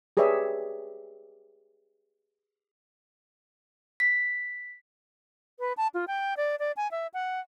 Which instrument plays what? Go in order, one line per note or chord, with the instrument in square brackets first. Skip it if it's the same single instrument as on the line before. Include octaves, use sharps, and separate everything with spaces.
[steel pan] G4 G#4 B4 C#5 D5 E5
[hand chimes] B6
[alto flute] B4
A5
F4
G5
D5
D5
G#5
E5
F#5